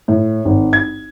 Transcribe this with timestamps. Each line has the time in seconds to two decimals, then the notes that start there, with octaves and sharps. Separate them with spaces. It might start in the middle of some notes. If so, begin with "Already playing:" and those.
0.08 A2
0.45 G#1
0.73 G#6